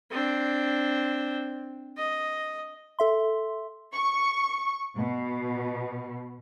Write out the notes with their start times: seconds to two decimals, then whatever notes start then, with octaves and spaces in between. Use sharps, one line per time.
0.11 C4 D4
1.97 D#5
2.99 A4 E5 C6
3.95 C#6
4.97 B2